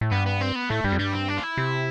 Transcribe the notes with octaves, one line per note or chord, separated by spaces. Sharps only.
A2
G2 B3
B3
C4
B3
A2 A3
G2 G3
F2
G2 G3
C4
D4
F4
E4
C3